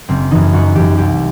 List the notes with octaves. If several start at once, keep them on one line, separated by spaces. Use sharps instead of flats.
F#1 C4
F#2 E3 D#4
F#1 F#4
F#2 E3 G4
C2 G4